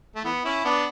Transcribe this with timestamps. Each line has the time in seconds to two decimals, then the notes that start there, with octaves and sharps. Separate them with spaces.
0.15 A3
0.24 E3 B3
0.44 C#4 E4
0.64 B3 D4